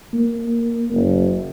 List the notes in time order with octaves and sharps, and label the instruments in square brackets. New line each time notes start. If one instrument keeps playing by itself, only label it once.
[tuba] A#3
F#1